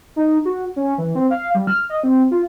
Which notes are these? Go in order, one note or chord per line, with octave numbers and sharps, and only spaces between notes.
D#4
F#4
C#4
E3
C4
F5
G3
F6
D#5
C4
F4